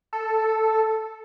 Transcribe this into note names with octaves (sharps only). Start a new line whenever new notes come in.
A4